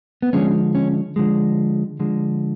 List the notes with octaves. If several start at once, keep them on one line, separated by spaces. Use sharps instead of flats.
B3
D3 F3 G#3 C#4
C#4
D3 F3 G#3
D3 F3 G#3